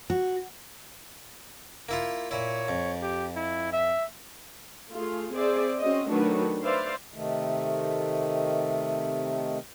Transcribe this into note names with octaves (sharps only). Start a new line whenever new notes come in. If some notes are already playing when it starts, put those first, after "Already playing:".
F#4
A#3 E4 F4
A#2 E4 C#5
F2
G4
E4
E5
A3 F4 G#4
C4 G#4 C5 D5 E5
C4 C#4 F#4 D#5
D#3 F#3 A3 D4 F#4 B4
B4 C5 D5 E5 F5 C6
C3 D#3 A3